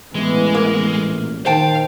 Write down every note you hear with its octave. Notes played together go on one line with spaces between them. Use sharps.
A1 E3 G#3 B3
A#3
A#1
D#3 C5 F5 G5 A5